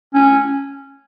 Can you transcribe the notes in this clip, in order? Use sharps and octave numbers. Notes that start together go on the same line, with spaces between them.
C#4